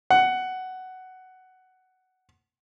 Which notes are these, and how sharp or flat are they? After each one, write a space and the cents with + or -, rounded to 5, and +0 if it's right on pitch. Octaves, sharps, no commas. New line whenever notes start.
F#5 +10